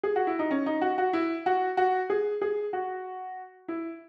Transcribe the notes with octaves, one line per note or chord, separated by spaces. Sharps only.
G#4
F#4
E4
D#4
C#4
D#4
F#4
F#4
E4
F#4
F#4
G#4
G#4
F#4
E4